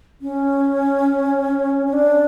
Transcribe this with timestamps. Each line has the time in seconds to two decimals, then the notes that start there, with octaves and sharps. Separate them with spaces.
0.21 C#4
1.87 C#4
1.93 D4